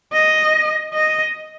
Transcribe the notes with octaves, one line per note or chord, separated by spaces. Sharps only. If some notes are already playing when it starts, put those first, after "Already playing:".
D#5
D#5